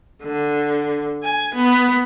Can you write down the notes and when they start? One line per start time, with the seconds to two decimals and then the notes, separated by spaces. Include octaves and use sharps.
0.23 D3
1.23 G#5
1.55 B3